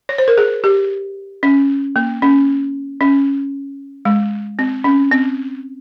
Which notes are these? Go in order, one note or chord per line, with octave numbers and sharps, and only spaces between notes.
C#5
C5
A#4
G#4
G4
C#4
A#3
C#4
C#4
G#3
C4
C#4
C4